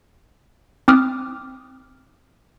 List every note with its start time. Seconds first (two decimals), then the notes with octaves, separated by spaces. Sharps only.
0.88 C4 D6 D#6 F6